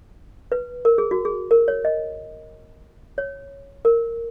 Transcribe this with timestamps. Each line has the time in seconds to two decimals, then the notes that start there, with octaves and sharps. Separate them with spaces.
0.52 B4
0.85 A#4
0.98 G#4
1.11 F#4
1.25 G#4
1.51 A#4
1.68 C#5
1.85 D#5
3.18 C#5
3.85 A#4